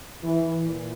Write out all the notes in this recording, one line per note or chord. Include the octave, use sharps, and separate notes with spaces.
E3
A#2